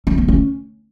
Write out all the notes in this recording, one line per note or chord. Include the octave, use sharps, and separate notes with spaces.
C#4
B3
C#4